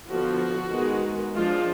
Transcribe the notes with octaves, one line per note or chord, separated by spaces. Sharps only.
D3 F3 B3 F#4
D#3 G#3 B3
F3 G#3 D4 F4